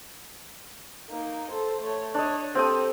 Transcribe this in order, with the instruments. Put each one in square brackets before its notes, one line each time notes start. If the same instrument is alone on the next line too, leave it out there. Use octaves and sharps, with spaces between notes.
[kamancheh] A#3 D#4
A4 C5
A3 C#5
[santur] D4 D#5 [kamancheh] C#5
[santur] C4 G5 D#6 [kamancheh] G4 A4